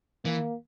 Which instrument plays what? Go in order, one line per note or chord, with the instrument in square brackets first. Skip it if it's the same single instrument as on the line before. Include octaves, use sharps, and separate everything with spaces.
[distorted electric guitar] E3 [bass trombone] A#3